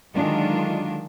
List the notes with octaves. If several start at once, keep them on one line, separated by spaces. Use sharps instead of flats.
D3 D#3 F#3 G#3 D4 F4